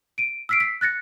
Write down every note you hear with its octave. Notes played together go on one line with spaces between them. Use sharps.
D7 D#7
E6 F6 B6 C7 D7
B6 C7
F#6 A6 A#6 C#7